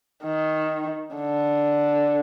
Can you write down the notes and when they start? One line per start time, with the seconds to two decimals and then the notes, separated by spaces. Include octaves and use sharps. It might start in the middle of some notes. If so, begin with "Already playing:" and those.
0.24 D#3
1.16 D3